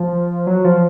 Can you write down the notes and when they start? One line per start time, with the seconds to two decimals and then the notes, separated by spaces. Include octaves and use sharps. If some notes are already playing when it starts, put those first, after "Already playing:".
Already playing: F3
0.47 F#3
0.64 F3